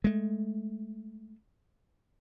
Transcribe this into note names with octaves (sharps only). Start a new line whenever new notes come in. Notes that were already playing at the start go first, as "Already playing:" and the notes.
G#3 A3